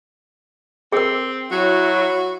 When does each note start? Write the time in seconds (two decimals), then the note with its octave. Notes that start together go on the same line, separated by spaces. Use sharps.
0.92 C4 G#4 A#4
1.51 F#3 E4 F#4 C#5